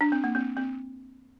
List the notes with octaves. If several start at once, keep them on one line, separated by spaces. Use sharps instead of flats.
D4
C4
A#3
C4
C4